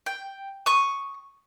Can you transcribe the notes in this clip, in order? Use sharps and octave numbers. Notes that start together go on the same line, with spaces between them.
G5
C#6 D#6